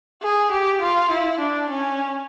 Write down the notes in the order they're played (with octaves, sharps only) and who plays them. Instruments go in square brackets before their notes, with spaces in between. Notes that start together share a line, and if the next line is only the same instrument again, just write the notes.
[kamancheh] G#4
G4
F4
E4
D4
C#4